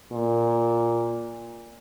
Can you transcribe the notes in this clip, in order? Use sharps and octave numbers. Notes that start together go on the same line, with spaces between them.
A#2